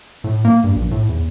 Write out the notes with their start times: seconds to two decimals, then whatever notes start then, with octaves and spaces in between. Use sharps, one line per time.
0.24 A2
0.45 A#3
0.64 G2
0.76 A#1
0.91 A2
1.09 E2